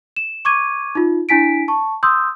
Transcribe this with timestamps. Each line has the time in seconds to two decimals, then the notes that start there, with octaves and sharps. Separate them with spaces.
0.16 E7
0.45 C#6 D6 G#6 D#7
0.95 D#4 F4
1.29 D4 E4 G#5 B6 D7
1.68 A5 C#6
2.03 C6 D#6 E6 G6